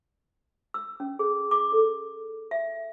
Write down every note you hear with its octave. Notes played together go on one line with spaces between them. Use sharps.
E6
C#4
G#4
D6
A4
E5